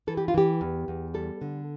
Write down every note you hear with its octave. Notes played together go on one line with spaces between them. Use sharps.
E3 A4
G4
F4
E3 G4
E2
E2
G3 A4
D3